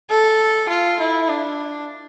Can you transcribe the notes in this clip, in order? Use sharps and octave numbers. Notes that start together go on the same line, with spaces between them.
A4
F4
E4
D4